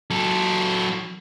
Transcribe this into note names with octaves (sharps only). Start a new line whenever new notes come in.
F#3 A4